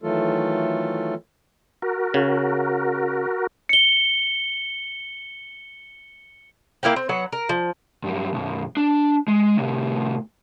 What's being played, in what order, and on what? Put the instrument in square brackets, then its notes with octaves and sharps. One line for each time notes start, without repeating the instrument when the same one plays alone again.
[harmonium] D#3 E3 F#3 A3 F4 A4
[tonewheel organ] F#4 A#4
[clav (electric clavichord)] C#3
[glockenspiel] C#7 G7
[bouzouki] A#3 E4 F5 G5
C4
F#3 B3 F#5
A#4
F3
[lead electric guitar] G2 F#3
B1 F#2
D4
G#3
A2 C3